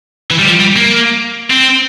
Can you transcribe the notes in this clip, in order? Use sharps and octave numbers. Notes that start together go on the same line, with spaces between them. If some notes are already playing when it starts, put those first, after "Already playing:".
E3
G3
F3
G3
A#3
C4